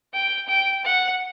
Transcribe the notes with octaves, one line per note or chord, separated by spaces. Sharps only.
G5
G5
F#5